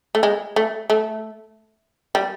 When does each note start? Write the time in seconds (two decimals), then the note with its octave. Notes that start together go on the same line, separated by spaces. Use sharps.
0.15 A3
0.23 G#3
0.56 A3
0.90 A3
2.15 G3